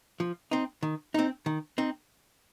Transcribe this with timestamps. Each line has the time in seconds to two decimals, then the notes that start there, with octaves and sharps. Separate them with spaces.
0.20 F3
0.51 C4 D#4
0.83 D#3
1.14 C4 D#4
1.46 D#3
1.78 C4 D#4